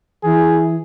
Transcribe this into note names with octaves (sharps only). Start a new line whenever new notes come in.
E3 G#4